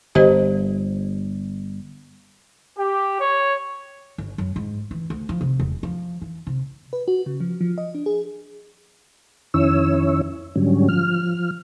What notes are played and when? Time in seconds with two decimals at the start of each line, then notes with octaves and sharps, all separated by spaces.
0.15 G1 G4 C5 D#5
2.78 G4
3.19 C#5
4.18 G1
4.38 F#2
4.56 G#2
4.91 E3
5.10 D2
5.29 F3
5.41 C3
5.60 E1
5.83 F3
6.21 E3
6.47 C3
6.93 B4
7.08 F#4
7.26 C#3
7.40 F3
7.61 F3
7.78 D#5
7.95 D4
8.06 G#4
9.54 F2 D#3 C#4 E4 C#5 E6
10.56 G#2 D3 F#3 G3 C#4
10.89 F3 F6